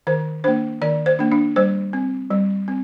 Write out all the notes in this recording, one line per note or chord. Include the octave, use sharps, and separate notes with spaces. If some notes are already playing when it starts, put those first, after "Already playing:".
D#3 C5
A#3 D4 C5
D#3 D5
C5
A#3 D4
D4
G3 C5
C4
G3
C4